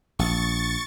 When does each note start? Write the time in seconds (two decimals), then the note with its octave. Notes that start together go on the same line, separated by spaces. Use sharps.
0.19 A#1 C#6 A6